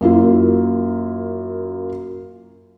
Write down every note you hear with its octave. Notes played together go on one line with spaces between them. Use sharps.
F#2 A#3 E4 F4